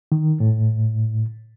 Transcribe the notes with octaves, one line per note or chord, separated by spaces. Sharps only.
D#3
A2